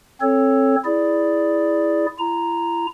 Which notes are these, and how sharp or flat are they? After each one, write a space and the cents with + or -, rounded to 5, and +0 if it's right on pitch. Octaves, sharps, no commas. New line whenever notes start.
C4 +25 A4 +0 C#5 +0
E4 +0 G#4 +0 D5 +0
E4 +40 A#5 +0